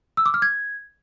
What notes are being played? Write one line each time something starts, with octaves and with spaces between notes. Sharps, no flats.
E6
D6
F6
G#6